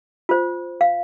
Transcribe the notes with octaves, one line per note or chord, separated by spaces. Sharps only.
F4 C5
F5